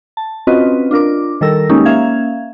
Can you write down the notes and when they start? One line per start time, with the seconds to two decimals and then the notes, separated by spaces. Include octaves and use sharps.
0.17 A5
0.47 C4 C#4 F4 F#4 B4 D#5
0.91 D4 F4 A#4 D6
1.41 D#3 G3 A4 A#4 E6 A#6
1.69 G#3 A#3 C#4 D#4 G4
1.85 A#3 C#4 E5 F5 G#6